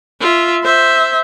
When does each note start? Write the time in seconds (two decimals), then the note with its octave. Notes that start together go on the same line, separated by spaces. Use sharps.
0.21 F4 E5
0.63 C5 E5